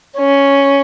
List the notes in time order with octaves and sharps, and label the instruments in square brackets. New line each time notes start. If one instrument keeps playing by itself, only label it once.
[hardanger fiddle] C#4